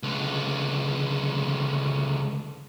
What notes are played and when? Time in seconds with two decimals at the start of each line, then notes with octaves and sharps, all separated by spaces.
0.03 C#2 D3